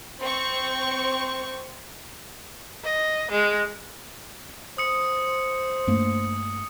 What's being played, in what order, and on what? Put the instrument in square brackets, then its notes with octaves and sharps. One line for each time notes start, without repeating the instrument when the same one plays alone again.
[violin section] C4 C#6 [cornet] C5
[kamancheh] D#5
G#3
[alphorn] C5 [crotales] D#6 C#7
[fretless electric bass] G2 A3 A#3